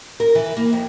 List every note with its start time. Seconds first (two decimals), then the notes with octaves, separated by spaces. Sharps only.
0.20 A#4
0.35 E3
0.57 A#3
0.73 F2